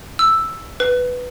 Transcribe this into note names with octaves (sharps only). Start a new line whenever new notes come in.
E6
B4